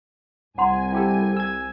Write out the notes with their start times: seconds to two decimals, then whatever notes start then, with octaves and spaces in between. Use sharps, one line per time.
0.58 C2 F#5 G#5 A#5 C6
0.92 E4 G4 A4 G5
1.37 E6 G#6